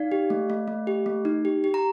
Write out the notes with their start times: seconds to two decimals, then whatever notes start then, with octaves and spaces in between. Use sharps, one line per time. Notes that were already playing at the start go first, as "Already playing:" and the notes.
Already playing: D#4 D5 F5
0.12 G4
0.30 A3
0.50 A3
0.68 A3
0.87 G4
1.06 A3
1.25 D#4
1.45 G4
1.64 G4
1.74 A#5